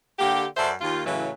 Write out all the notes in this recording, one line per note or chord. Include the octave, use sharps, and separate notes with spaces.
D3 A#3 G4
F#2 A4 C5 D5 E5
D#2 F4
A2 C#3 E3 F#3